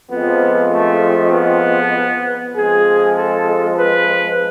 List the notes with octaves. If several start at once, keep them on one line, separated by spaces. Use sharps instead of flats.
F2 F3 G#3 B3
A3
B3
F2 F3 G#3 G#4
A4
B4